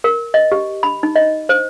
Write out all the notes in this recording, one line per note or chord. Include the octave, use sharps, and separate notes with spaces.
A#4
D#5
G4
B5
D#4
D#5
C5